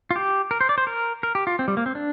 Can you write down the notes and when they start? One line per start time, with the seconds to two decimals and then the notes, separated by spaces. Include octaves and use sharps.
0.11 F4
0.16 G4
0.51 A#4
0.61 C5
0.69 D5
0.78 C5
0.87 A#4
1.23 A#4
1.35 G4
1.47 F4
1.59 C4
1.68 G3
1.77 A#3
1.86 C4
1.95 D4